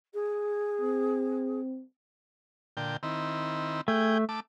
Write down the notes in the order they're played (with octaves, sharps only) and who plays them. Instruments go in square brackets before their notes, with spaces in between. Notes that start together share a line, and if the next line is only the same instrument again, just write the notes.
[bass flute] G#4
[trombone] C4
[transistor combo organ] A#2 D3 G5
D#3 C4 E4
[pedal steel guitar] A3 [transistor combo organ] G#4 G5
[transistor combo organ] A3 D6